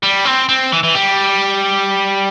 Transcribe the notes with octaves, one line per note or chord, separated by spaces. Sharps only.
G3
C4
C4
E3
E3
G3